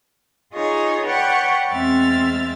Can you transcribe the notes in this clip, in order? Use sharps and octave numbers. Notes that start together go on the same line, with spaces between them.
D#4 F4 G#4 C#5 D#5 G#5
B4 C#5 D5 F#5 G5 C#6
E2 G#3 C4 E5 F6 A6